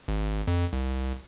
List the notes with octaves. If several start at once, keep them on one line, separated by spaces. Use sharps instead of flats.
G#1
F2
C2